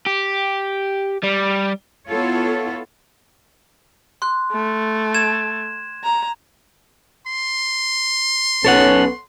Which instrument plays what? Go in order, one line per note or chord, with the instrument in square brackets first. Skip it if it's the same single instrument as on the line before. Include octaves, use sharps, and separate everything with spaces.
[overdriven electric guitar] G4
G3
[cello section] B3 E4 F4 A4 C#5
[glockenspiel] C6 F#6
[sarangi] A3
[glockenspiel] G#6 E7
[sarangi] A#5
[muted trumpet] C6
[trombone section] B1 C#4 [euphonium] B3 [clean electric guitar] A4 C#5 F#5